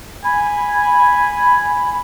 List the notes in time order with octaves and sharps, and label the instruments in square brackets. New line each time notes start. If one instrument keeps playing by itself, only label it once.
[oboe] G#5 [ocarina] B5